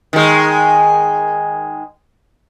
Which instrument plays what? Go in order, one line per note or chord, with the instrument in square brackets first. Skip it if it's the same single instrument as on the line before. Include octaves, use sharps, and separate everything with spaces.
[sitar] D#3 G#3